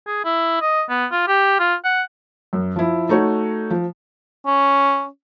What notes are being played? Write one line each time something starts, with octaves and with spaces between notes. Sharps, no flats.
G#4
E4
D#5
B3
F4
G4
F4
F#5
F#2
F3 E4
A3 D#4 F#4 C#5
F3
C#4